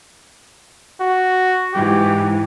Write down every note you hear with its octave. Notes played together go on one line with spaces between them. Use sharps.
F#4
G#2 E3 G4